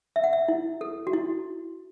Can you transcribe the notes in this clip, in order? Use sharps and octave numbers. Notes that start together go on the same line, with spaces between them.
E5
F#5
E5
E4
A4
F#4
E4